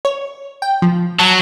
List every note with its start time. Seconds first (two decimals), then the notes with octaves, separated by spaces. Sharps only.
0.05 C#5
0.62 G5
0.82 F3
1.19 F#3 A5